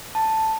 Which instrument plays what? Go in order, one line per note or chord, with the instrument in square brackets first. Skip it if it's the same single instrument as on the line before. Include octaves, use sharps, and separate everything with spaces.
[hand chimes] A5